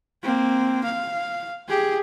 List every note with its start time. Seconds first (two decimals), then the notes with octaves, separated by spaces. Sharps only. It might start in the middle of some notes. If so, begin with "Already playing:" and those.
0.23 A#3 C4
0.84 F5
1.68 G4 G#4